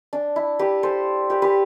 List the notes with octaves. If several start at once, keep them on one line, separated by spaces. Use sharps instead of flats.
D4
E4
G4 B4
A4 C5
G4 B4
G4 B4